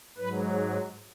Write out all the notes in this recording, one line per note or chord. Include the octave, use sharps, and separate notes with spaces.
G#2 F#3 B4